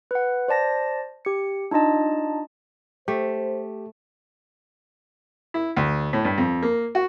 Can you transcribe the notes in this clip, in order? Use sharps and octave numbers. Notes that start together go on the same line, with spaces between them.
B4 F#5
C5 D5 A5 A#6
G4 C#7
D4 D#4 F4 D#5 A5
A3 G4 C5
E4
D2
A2
G2
F2
A#3
F#4